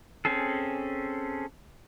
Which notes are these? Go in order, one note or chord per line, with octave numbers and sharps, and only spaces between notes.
C4 C#4 G#4 A4